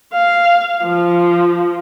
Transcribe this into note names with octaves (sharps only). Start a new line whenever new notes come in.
F5
F3